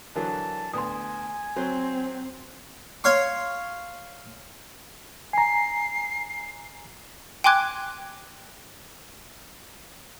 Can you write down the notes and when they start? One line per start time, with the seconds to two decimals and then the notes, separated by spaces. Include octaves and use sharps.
0.16 D3 E3 F#3 A#4 A5
0.73 D2 B3 G#5 C6 D#6
1.56 F#3 C4 C5
3.04 C#5 F5 C6 C#6
5.33 G#5 A#5 C7
7.44 G5 G#5 C6 D6 F#6 G#6